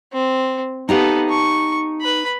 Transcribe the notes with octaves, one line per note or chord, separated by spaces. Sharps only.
C4
B3 D#4 G4 A4 F5
C#6
B4 B5